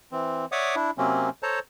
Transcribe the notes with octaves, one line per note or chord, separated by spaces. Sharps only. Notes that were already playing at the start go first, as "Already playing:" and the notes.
E3 C4
C#5 D5 E5 F#5 D6 D#6
D4 E4
C3 F#3 A#3 C4 C#4
A4 C5 C#5 A5 A#5